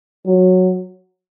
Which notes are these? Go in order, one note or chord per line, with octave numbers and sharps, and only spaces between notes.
F#3